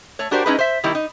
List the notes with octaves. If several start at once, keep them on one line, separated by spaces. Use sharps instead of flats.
A3 C#5
D4 F#4 G4 A#4 C5 D5
G#3 C#4 D#4 E4 G#4 B4
C5 E5
D#3 G3 A#3 E4
D#4